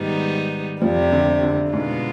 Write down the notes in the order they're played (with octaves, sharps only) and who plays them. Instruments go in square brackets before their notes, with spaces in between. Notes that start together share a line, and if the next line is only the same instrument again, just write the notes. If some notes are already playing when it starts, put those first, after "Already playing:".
Already playing: [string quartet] G#2 D#3 G3 B3 D#4
[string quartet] F2 C3 G3 [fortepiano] F3
[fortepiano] D3
D3
[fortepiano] G#2 [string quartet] B2 G#3 B3 F4